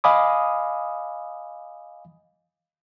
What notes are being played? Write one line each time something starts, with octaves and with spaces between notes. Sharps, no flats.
D#5 F5 G#5 B5 D6 D#6